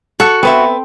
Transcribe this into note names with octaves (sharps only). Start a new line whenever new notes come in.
F#4 A4
B3 C4 B4 E5